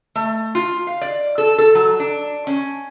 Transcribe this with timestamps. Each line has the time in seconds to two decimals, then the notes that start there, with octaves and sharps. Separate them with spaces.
0.15 A3
0.55 F4
0.87 F5
1.01 D5
1.38 A4
1.58 A4
1.75 F#3
2.00 D4
2.47 C#4